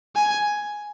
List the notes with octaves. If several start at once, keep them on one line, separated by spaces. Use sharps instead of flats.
G#5